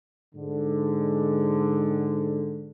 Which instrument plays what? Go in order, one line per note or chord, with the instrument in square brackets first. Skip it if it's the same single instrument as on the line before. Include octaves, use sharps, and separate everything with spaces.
[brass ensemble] G#2 D3